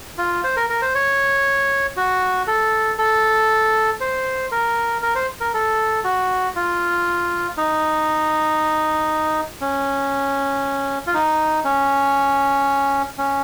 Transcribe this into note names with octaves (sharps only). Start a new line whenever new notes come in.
F4
C5
A#4
A#4
C5
C#5
F#4
A4
A4
C5
A#4
A#4
C5
A#4
A4
F#4
F4
D#4
C#4
F4
D#4
C#4
C#4